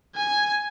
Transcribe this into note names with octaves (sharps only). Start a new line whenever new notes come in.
G#5